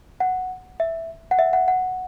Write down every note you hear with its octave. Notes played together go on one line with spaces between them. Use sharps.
F#5
E5
F#5
E5
F#5
F#5